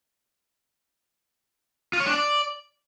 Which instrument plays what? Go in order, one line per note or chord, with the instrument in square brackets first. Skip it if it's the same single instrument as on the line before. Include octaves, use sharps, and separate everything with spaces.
[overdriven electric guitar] F4
C#5
D4
D5